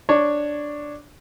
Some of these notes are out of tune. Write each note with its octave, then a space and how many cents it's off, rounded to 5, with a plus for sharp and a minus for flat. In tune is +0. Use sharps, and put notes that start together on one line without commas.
D4 +0 C#5 +0